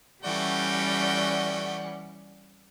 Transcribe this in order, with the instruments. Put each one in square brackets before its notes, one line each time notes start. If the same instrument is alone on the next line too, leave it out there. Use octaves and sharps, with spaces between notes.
[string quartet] E3 D5 F#5 [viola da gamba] G3 C#4 [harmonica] A3 F#4 G5